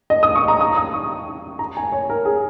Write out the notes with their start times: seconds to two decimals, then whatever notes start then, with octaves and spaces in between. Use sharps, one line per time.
0.10 D#5
0.23 D#6
0.36 C#6
0.48 A#5
0.61 D#6
0.76 D#6
0.93 C#6
1.59 A#5
1.77 G#5
1.92 C#5
2.10 A#4
2.25 G#4